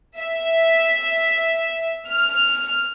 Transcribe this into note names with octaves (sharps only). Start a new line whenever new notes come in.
E5
F6